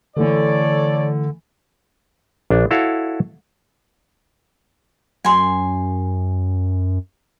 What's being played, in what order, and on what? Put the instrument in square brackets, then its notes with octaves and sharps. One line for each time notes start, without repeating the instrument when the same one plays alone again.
[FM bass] D3 [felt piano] E3 A3 [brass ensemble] A4 C#5 D5
[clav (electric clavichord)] A#1 D4
E4 F#4 A4 C#5 F5
[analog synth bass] F#2 [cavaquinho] G#5 C6